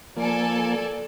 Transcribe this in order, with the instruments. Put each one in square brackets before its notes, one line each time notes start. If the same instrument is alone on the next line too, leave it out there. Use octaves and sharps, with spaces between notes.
[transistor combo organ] F3 A#3 [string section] A4 D5 G#5